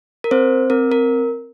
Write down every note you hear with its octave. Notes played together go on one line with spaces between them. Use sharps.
A#4
C4 C5
C4 A#4
A#4